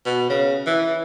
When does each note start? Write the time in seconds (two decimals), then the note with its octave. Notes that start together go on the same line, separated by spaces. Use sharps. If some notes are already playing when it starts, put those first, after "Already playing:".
0.06 B2
0.29 C#3
0.66 E3